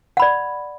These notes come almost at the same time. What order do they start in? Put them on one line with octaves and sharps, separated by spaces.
F#5 B5 D5